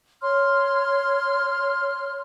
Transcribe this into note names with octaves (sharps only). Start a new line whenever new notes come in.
C#5 C6 F6